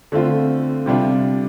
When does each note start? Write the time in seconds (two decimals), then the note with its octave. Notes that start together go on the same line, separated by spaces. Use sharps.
0.12 D3 A3 C4 F4
0.86 C3 G3 D4 F4